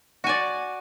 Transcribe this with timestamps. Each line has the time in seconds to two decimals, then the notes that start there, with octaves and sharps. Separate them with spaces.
0.24 F#4
0.27 G#5
0.29 D5